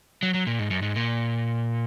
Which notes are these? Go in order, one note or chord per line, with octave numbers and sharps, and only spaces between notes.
F#3
F#3
A#2
G#2
F#2
G#2
A#2